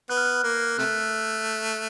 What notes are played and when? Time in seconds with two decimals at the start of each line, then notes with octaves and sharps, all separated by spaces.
0.09 B3 F#6
0.17 F6
0.25 F#6
0.44 A#3
0.78 C3 A3 F#6